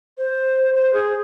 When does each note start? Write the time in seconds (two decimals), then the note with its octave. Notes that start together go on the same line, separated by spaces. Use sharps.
0.18 C5
0.74 C5
0.93 G#4